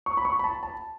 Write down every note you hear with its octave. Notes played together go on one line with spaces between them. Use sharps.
C#6
B5
C#6
B5
A5
A5